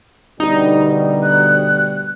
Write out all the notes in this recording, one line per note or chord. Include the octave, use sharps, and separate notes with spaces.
D2 B2 G3 D#4
F#6